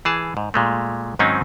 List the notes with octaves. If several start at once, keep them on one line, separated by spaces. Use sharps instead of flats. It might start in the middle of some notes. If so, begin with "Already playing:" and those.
E3 G#4 A5
G#2
A#2 G#3 A3
G#2 D#3 F#3 C4 C#4 D#4